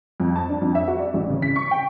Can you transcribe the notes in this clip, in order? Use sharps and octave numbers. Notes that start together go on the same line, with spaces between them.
F2
A5
D4
F2
E5
F#4
D5
A1
C#3
B6
C#6
G5